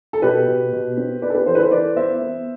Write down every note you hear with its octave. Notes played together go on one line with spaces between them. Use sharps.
A4
B2 G4 B4
B2
B2
C4
B3 B4 D5
A4
G4 B4
E3 A4 C5
B4
A4 C5
E3 B4 D5
B3 C5 E5
B3